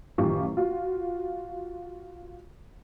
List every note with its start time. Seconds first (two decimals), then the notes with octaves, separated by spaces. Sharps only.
0.18 A1 F#2 D#3 F4 G4 C#6
0.57 F4 F#4 F5